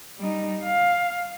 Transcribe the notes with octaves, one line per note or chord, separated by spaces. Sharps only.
G3 D#4
F5